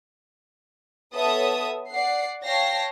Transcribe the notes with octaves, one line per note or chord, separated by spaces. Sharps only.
B3 A4 B4 C#5 E5 D#6
D5 F#5 C7
C#5 F5 G5 A5 A#6 C7